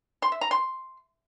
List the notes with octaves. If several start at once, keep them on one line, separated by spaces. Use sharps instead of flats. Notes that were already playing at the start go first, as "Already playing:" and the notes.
C6
E5
A#5
C6